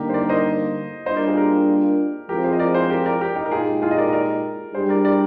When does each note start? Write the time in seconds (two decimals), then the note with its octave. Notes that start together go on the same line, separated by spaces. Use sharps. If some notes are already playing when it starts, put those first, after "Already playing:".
Already playing: D3 G3 A#3 D#4 G4 A#4
0.09 C5
0.14 A#4 D5
0.29 C5 D#5
1.06 G3 A#3 D4 F4 C5 D#5
1.16 A#4 D5
1.27 G#4 C5
1.37 G4 A#4
2.29 F3 G#3 C4 F4 G4 A#4
2.44 G#4 C5
2.52 D#5
2.59 A#4 D5
2.74 G#4 C5
2.90 G4 A#4
3.06 A#4 D5
3.21 G4 A#4
3.36 D#4 G4
3.46 A#4
3.51 A#2 G#3 D#4 F4 G4 G#4
3.82 F4 G#4
3.91 D#5
3.98 A#4 D5
4.09 D#5
4.13 A#4 D5
4.74 G3 D4 G4 G#4 C5
4.89 A#4 D5
5.05 A#4 D5